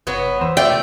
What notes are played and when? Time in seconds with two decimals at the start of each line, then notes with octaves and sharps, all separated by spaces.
0.07 G1 F#3 B3
0.41 E2 C5 E6
0.57 A3 D5 E5 G5